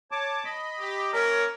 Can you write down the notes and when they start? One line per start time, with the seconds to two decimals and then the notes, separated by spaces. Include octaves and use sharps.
0.11 C#5 A5 D6
0.44 D#5 B5
0.79 G4
1.13 A#3 C#4 A#4 C#5